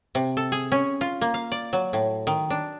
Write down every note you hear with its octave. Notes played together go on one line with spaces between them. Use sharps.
C3
A4
G#4
C#4
F4
A#3
F5
D5
F#3
A2
D#3
D4